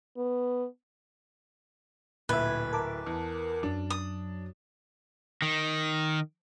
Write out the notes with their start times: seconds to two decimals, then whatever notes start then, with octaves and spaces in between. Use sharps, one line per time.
0.17 B3
2.29 D1 A#2 B4 E5 G#6
2.73 A#4 A5 D6
3.07 E2
3.63 F#2 F#3 D4
3.90 D#6
5.42 D#3